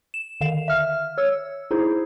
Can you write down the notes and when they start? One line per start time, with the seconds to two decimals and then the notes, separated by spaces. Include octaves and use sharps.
0.14 E7
0.41 D3 D#3 F5 E7
0.68 E5 F6
1.18 C#5 E6
1.71 D#4 E4 G#4 C5